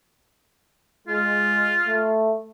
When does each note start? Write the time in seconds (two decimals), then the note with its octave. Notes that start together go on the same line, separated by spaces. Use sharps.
1.07 G#3 F4
1.87 A3